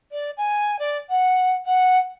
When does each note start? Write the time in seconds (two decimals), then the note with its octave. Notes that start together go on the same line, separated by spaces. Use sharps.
0.11 D5
0.37 G#5
0.79 D5
1.09 F#5
1.65 F#5